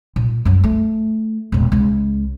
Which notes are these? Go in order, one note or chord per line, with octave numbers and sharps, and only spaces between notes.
A#2
F#2 F#3
A3
E1 A#2
C#2